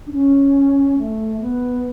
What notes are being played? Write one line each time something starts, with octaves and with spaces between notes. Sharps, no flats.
D4
C#4
A3
B3